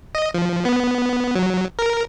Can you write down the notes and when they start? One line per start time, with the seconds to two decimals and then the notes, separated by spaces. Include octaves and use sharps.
0.15 D#5
0.34 F3
0.65 B3
1.35 F#3
1.79 A#4